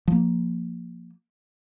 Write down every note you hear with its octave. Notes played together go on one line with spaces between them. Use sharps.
F3 A#3